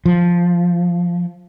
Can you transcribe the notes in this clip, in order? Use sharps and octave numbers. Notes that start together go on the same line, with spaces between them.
F3